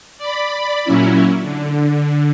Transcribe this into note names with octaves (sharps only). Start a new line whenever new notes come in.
D5 B5
A#2 F#3 C#4 E4
D3